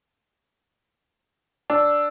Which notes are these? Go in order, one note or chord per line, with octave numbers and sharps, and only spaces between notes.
D4 E6